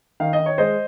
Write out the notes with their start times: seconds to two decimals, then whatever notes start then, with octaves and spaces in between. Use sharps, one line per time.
0.20 D#3 F5
0.33 D#5
0.40 D#3
0.46 C#5
0.58 G#3 C5 D#5